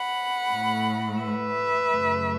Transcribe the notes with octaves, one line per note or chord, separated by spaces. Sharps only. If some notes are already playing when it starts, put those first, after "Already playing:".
Already playing: F#5 B5
A2 A3
B4 E5
F#2 C#3 F#3 A3